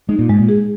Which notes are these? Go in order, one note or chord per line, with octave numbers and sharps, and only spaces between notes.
G#3 D#4
A#2
G#2 G#3
A#2
G#4